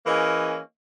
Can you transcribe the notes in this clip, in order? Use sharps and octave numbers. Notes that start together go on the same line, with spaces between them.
E3 A#3 C#4 G#4 D#5